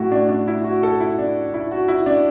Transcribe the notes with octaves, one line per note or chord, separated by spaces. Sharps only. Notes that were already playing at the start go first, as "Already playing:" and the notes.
Already playing: A2 A3 E4 F#4
D4
D4
E4
F#4
A4
E4
D4
E4
F#4
E4
D4